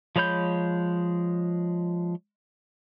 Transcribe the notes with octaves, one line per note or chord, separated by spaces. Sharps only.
F3 G#3 C#5 B5 G6